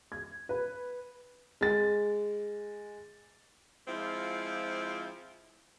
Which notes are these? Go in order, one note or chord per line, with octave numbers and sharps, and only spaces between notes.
G#6
B4
G#3 A6
F3 G#3 C4 E4 F4